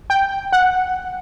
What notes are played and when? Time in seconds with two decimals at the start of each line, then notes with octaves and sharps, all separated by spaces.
0.10 G5
0.52 F#5